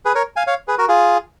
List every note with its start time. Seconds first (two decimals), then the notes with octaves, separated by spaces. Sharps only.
0.05 G#4 B4
0.15 A#4 C#5
0.36 F5 G#5
0.47 C#5 F5
0.68 G#4 B4
0.78 F#4 A#4
0.88 F4 G#4